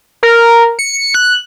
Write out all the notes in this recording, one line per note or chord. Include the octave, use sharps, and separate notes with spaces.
A#4
C#7
F#6